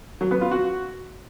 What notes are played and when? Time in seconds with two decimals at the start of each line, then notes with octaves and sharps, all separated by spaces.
0.21 F#3
0.31 B3
0.41 F4
0.51 F#4